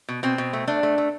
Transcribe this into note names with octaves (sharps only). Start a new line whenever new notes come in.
B2
B2 C4
B2
A3
A3 D4
A3
A3